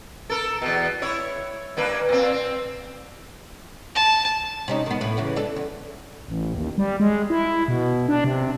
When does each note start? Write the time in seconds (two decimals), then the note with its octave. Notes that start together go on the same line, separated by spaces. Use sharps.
0.30 A4 A#4
0.62 E2 B2
1.02 E4 C#5
1.77 G2 A#3 B4
2.09 A#2 C4
2.32 C4
3.95 A5
4.68 C3 C#4 D#4
4.86 D#3 B3
5.01 A2 B4
5.17 E2 C#3 E3
5.36 D4 A4
5.56 E2
6.28 A1
6.54 D#2
6.78 G3
7.00 G#3
7.30 E4
7.68 B2
8.09 D4
8.24 C3